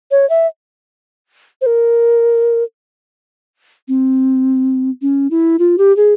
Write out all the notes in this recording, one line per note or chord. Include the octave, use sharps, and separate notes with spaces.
C#5
E5
C5
A#4
C4
C#4
E4
F4
G4
G#4